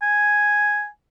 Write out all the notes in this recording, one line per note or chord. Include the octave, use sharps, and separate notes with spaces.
G#5